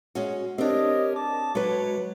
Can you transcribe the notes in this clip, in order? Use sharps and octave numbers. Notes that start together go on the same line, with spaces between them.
G#3 C#4 F#4
C4 D4 G4 A#4 C#5 D#5
A5 D6
F#3 G#3 B4 C#5